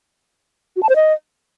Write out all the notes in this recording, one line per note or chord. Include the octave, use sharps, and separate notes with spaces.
F#4
A5
C5
D#5